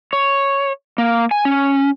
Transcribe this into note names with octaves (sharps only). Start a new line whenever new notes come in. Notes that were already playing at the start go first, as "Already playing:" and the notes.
C#5
A#3
G#5
C#4